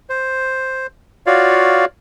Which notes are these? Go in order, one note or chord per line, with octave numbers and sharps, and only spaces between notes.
C5
F4 F#4 C#5 D5 F5